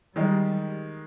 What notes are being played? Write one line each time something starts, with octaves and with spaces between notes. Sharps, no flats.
D#3 G3 G#3 D#4